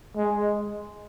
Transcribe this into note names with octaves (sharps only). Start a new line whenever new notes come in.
G#3